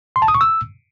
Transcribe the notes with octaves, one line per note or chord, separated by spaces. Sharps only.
C6
A5
D#6
C#6
E6